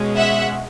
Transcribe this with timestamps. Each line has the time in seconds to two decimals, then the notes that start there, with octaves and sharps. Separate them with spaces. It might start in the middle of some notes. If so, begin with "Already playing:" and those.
Already playing: B2 G#3 C#4
0.17 E5 F#5